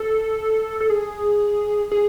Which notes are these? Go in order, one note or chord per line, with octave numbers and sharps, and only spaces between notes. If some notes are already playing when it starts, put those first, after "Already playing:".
Already playing: A4
A4
G#4
G#4